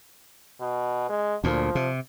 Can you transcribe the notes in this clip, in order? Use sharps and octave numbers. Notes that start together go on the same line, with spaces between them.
B2
G#3
D2 A#2 F3
C3